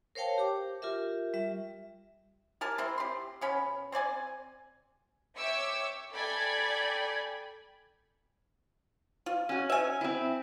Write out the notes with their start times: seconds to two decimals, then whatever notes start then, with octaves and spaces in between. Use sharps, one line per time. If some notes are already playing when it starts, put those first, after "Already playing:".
0.15 A#4 C5 C#5 F5 G5 A5
0.38 G4 D6
0.82 F4 G4 A#4 E5
1.34 G3 E5
2.61 G4 A#4 G#5 A5
2.78 C4 E4 C5
2.98 G4 C6
3.41 B2 C#4 B5
3.92 C4 C#5 D5 G#5
5.37 C#5 E5 G5 D6 E6 C#7
6.13 A4 D5 G5 G#5 B5 G#6
9.26 F4
9.49 C#4 F#4
9.70 E5 G#5
10.01 C4 E4